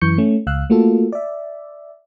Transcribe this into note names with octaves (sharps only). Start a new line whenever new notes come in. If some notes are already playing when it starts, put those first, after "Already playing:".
F#2 E3 C#6 G6 C#7
A3 C#4
C#2 F5 E6 F#6
A3 A#3 F4 F#4 A4
D5 E5